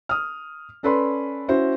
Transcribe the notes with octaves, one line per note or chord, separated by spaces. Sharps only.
D#6 F6
C#4 A4 B4 D5 B5 C6
C#4 E4 F#4 C5